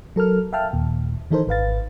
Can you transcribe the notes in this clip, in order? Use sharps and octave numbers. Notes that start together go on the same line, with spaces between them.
F#3 A4 A#4 F6
E5 F5 G5 A5 F6
D#2 A#2
D#3 E3 D#4 A4 A#4 C5
G#1 B4 F5 A6